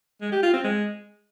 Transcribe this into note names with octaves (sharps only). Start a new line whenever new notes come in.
G#3
G4
F4
C4
G#3